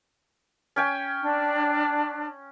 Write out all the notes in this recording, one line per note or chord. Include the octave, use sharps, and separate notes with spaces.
C#4 G5 G#5
D4